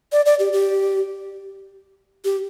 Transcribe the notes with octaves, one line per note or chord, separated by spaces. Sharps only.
D5
D5
G4
G4
G4